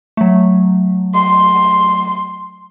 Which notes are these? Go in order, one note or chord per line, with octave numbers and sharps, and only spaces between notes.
F#3 A3
C6